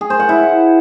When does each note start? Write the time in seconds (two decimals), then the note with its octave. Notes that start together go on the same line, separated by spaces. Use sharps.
0.01 G#4
0.10 C5
0.20 F#5
0.29 E4